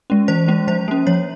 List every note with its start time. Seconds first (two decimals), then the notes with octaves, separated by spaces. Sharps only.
0.10 G#3 C#4
0.28 E3 C5
0.48 G#3 C#4
0.68 F3 C5
0.88 A#3 C#4
1.07 F3 C#5